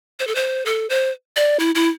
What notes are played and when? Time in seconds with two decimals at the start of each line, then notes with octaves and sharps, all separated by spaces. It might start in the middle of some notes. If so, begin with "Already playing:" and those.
0.19 C5
0.27 A4
0.35 C5
0.66 A4
0.90 C5
1.36 D5
1.60 E4
1.75 E4